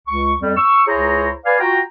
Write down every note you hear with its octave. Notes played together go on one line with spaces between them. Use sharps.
C#2 C#6
F2 G3
C#6 E6
C#2 E4 G#4 C5 C#5 A#5
B4 D5 F5 G#5
F4 F#4 G5 A#5